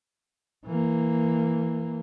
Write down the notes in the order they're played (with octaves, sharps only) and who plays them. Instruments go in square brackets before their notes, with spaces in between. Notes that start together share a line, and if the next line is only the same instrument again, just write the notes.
[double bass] E3 A#3